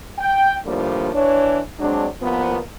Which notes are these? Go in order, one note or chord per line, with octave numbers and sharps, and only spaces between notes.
G5
A2 D3 F3 G3 A#3
E3 D4 C#5
F#3 G#3 C4 D4
C2 F3 A#3 B3